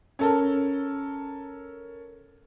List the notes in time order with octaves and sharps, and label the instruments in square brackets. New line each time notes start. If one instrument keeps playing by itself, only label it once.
[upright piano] C#4 A4 A#4